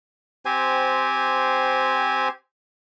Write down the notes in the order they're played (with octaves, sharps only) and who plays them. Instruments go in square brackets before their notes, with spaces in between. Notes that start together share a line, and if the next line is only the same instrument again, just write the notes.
[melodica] C4 G4 C5 G#5